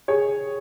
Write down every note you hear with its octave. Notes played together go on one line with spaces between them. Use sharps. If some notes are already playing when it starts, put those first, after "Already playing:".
G#4 C#5